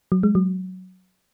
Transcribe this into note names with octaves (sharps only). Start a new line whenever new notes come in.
F#3
G#3
F#3